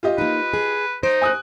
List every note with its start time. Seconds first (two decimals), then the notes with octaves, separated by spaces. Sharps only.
0.03 F4 G4 D#5
0.18 A#3 D#4 B4
0.54 G#4
1.03 D#4 C5 D7
1.22 G#5 D#6 F#6